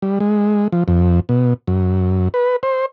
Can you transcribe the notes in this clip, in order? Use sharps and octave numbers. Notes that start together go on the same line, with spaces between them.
G3
G#3
F3
F2
B2
F#2
B4
C5